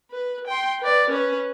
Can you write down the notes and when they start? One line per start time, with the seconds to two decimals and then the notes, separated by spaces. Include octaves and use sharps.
0.11 B4
0.47 G5 C6
0.81 B4 D5
1.10 C#4 B4